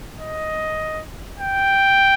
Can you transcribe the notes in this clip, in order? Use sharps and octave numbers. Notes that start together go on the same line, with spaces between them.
D#5
G5